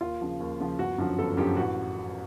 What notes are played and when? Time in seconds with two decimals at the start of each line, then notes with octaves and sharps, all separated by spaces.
0.01 D#2 F4
0.21 C#3 F3
0.40 D#2
0.60 C#3 F3
0.79 G1 F#4
0.98 F#2 D3 F3
1.18 G1 A4
1.37 F#2 D3 F3 G4
1.57 A1 F#4